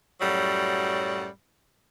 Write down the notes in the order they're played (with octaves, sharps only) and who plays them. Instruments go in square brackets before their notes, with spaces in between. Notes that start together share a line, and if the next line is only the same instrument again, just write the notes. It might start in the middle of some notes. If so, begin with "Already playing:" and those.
[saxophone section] F#2 A2 F#3 G3